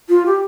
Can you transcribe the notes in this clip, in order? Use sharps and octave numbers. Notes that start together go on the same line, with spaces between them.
F4
G4